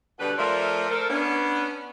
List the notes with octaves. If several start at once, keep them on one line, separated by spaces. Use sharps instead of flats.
B2 D3 G3 B4
F3 A3 F4 A#4 D5 E5
A4 A#4 C5
B3 C#4 D4